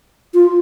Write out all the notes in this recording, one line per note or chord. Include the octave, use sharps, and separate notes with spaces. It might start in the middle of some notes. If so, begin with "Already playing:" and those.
F4